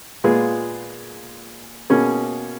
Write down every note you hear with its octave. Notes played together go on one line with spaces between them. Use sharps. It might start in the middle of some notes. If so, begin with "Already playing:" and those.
A#2 G#3 B3 F4 G#4
B2 A#3 C#4 G#4